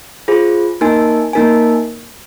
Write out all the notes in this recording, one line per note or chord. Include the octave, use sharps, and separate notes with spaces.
F4 G#4 C5
A#3 D#4 A#4 G#5
A#3 D#4 A#4 G#5